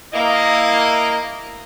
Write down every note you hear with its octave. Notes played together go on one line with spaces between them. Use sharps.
A#3 E4 D#5